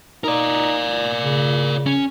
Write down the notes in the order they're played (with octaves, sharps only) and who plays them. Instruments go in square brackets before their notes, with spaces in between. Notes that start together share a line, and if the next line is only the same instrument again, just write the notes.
[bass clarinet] D#4 [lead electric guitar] A#4 D5
[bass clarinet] C#3
[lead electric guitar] C#4